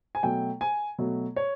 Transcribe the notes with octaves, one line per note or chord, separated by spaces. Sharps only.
G#5
B2 F#3 A3 G5
G#5
B2 F#3 A3
C#5